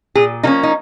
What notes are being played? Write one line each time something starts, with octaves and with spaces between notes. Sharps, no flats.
A#2 G#4
F3 A#3 C#4 D#4
D#4